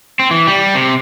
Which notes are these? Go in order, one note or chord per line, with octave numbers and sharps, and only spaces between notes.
C4
E3
G3
C3